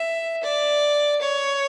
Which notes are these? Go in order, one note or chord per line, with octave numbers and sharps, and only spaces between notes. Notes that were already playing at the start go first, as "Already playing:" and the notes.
Already playing: E5
D5
C#5